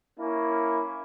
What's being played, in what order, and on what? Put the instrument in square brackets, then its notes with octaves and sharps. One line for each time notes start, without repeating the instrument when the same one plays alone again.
[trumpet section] A#3 C#4 E4